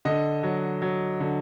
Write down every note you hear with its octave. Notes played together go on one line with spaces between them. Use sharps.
D3 D#5
F#3
F#3
D3